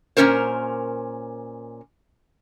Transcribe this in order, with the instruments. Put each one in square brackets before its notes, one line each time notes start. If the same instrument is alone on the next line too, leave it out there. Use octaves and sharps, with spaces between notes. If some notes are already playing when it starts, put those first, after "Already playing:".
[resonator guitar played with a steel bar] A#2 G#3 C#4 A#4 C5